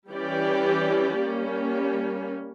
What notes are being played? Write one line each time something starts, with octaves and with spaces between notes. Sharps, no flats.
E3 G3 C#4 G4 D5
G3 A#3 C#4